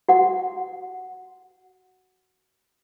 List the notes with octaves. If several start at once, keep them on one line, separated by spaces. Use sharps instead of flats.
F#4 F#5